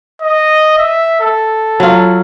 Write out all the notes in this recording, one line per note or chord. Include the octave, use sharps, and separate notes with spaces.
D#5
E5
A4
F#3 F4